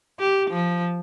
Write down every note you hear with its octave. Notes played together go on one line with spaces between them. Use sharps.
G4
F3